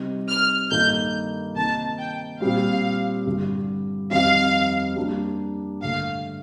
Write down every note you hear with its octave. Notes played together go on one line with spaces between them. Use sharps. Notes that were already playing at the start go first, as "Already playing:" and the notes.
Already playing: C3 G3 C4 D#4 G4
F6
G2 D#3 A#3 D#4 A4 G6
C3 D#3 A#3 D#4 A5
G5
A#2 G3 C4 F5
G2 D3 G3
F2 D#3 G3 C4 D#4 F5
G3 A#3 D4
G2 D3 A3 F5